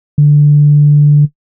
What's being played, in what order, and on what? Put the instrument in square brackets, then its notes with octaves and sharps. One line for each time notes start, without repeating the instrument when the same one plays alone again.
[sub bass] D3